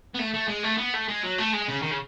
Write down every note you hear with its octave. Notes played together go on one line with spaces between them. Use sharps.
B3
A3
A3
G#3
A3
B3
A3
G#3
F#3
A3
G#3
C#3
D#3
C#3